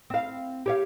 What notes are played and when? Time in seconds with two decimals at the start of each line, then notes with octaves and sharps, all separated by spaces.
0.10 C4 F5
0.66 G4 C#5 F5